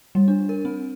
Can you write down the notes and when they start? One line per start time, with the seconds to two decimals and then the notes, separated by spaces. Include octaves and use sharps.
0.15 G3
0.28 D4
0.49 A#4
0.65 C4